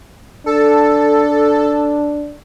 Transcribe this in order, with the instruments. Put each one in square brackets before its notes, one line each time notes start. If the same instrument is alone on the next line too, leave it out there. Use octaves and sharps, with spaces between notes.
[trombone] D4 [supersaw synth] A4